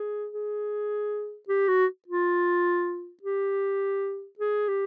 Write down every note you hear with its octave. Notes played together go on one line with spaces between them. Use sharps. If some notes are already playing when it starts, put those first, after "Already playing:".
Already playing: G#4
G#4
G4
F#4
F4
G4
G#4
G4